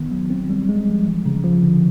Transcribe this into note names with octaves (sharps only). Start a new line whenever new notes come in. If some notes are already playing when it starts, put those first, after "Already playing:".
Already playing: D#3 B3
F#3
C4
G3
G#3
F3
E3
C#3
F3
D3